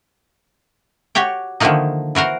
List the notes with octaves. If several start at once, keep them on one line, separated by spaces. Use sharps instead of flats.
F#4 G4 C#5 G5
D3 D#3 F3 A3 A#3 D#4
E3 F#4 A#4 C5